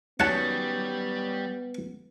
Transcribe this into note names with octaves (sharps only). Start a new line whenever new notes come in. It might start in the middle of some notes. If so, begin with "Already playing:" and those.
D#3 F#3 G3 B3 C#4 F#5 A5